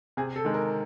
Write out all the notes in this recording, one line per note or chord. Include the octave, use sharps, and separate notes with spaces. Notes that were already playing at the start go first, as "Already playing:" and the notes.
C3 G#4
A4
D#3 G#3
A#4